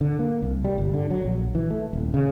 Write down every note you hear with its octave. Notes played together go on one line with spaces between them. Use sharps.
D3
A#3
C2
G3
G1
D3
F#3
A#1
E3
A3
D#1
C#3